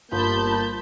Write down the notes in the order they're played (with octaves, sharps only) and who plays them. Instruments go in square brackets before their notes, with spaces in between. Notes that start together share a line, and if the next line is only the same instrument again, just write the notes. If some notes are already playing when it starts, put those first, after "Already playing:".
[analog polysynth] G1 [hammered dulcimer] F3 [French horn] A#3 [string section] A5 B5 G6